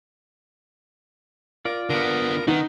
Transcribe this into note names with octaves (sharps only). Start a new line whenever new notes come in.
F4 A#4 D5
D3 B3 A#4
D#3 B3 D#4